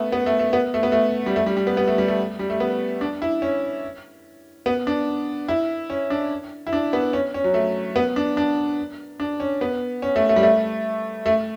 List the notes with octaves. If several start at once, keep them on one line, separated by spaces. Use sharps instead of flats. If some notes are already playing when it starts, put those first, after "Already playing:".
Already playing: A3 B3
B3
A3
A3
B3
A3
B3
A3
G3
A3
G3
G3
B3
B3
A3
G3
A3
G3
A3
B3
D4
E4
C#4
B3
D4
E4
C#4
D4
E4
D4
B3
C#4
C#4
F#3
A3
B3
D4
D4
D4
C#4
B3
C#4
A3
A3
G3
A3
A3